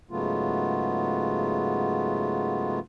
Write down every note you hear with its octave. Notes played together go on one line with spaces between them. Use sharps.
G#2 C#3 F#3 A3 B3 F4